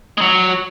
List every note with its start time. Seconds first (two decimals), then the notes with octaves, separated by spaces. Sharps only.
0.18 G#3
0.21 F#3